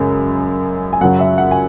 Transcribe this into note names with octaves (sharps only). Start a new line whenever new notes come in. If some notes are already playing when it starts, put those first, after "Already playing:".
Already playing: F#2 C#3 G#3
G#5
F#2 C#3 F#3 F#5
E5
F#5
G#5